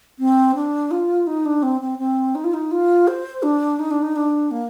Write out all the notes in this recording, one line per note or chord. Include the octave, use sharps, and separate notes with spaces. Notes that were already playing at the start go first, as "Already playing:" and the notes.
C4
D4
F4
D#4
D4
C4
C4
C4
D#4
F4
D#4
F4
C5
D4
D#4
D4
D#4
D4
A#3